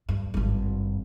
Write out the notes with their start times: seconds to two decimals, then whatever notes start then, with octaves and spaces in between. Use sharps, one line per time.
0.09 G2
0.34 G#1 G2